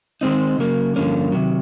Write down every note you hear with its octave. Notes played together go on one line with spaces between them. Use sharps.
D#3 G#3 C4 D#4
C#3 F#3 A#3
G2 D3 F3 A#3 C#4
C3 D#3 F#3